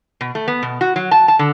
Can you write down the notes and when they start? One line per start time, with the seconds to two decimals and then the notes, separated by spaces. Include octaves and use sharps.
0.21 B2
0.35 A3
0.48 B3
0.63 B2
0.81 F#4
0.96 F#3
1.11 A5
1.28 A5
1.39 D3